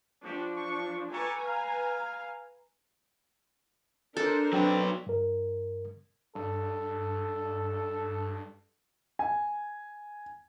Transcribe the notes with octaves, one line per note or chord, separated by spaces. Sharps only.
F3 D4 F#4 G4
C#6
G4 A4 B4 G#5 A#5 C#6
F5
D4 A4 A#4 C5
F#3 C4 D4 B4
G2 A#4
G2 A4
G#5